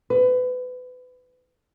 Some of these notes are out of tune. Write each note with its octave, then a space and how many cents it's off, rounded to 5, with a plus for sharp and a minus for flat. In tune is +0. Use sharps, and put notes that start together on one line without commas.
B4 +30